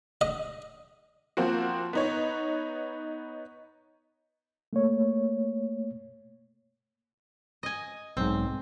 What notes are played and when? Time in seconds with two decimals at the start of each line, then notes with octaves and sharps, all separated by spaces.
0.21 D#5
1.37 F3 A#3 C4 F#4
1.93 B3 D#4 C#5
4.73 A3 A#3 C#5
7.63 D#5 G#5
8.17 B1 G#2 C4